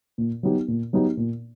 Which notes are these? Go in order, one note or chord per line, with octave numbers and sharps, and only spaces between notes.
A#2
F#3 B3 D#4 G4
A#2
F#3 B3 D#4 G4
A#2